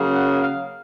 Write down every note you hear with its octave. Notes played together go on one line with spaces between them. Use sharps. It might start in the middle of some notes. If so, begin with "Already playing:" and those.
Already playing: C#3 F#3 A#3
F#5
F5